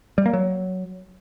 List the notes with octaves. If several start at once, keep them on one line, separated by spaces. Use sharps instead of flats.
G3
A#3
F#3